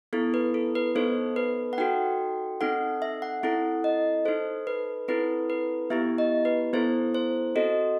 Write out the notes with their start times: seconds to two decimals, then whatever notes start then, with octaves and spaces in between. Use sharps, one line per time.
0.13 B3 E4 A4
0.34 B4
0.54 A4
0.75 B4
0.95 B3 D#4 A4 C5
1.36 B4
1.73 F#5
1.78 D#4 F#4 A4 G5
2.61 C4 D#4 A4 F#5
3.02 E5
3.22 F#5
3.43 C4 E4 A4 F#5
3.84 D#5
4.25 D#4 A4 C5
4.67 B4
5.08 C4 E4 A4 B4
5.50 B4
5.90 B3 E4 G4 E5
6.18 D#5
6.45 B4
6.73 B3 E4 A4 C5
7.14 C5
7.56 C4 F#4 A4 D#5